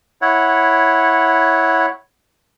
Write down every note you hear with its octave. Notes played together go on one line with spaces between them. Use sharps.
E4 C#5 F#5